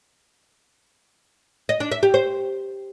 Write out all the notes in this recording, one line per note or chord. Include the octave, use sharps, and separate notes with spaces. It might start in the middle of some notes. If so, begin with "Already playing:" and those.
D#5
D4
E5
G4
C5